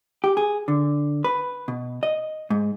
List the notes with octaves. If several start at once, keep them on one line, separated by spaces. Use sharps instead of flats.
G4
G#4
D3
B4
B2
D#5
G#2